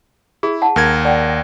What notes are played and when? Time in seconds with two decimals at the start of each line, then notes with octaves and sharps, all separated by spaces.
0.43 E4 G#4
0.62 F#5 A5
0.76 D#2 A#4 G#6
1.05 D5 F#5 G5